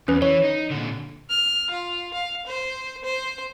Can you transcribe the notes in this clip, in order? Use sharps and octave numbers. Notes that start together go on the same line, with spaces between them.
E2 C#4 B4
E3 C#5
D#4
A#2 D3
F6
F4
F5
C5
C5